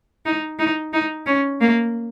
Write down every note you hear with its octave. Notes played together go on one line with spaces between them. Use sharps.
D#4
D#4
D#4
C#4
A#3